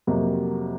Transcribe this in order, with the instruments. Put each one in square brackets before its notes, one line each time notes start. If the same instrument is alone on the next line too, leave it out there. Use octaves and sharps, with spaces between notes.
[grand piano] F2 C3 F#3 A#3